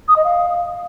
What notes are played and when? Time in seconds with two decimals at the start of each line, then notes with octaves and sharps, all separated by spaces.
0.08 D#6
0.16 D#5
0.24 F5